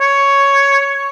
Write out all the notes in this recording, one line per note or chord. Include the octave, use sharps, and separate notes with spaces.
C#5